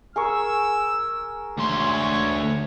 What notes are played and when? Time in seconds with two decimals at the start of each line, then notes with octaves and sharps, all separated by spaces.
0.16 G#4 A#4 C#6 E6
1.58 D2 C#5 C6